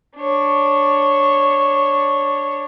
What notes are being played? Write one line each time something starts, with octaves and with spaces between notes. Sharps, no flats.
D4 C#5